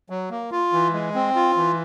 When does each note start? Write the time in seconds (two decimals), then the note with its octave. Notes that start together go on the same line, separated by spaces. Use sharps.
0.10 F#3
0.31 A#3
0.51 F4
0.73 E3
0.93 G#3
1.15 C4
1.35 F4
1.57 E3